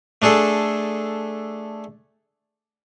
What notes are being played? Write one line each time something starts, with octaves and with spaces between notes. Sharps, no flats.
A3 D4 G#4 A4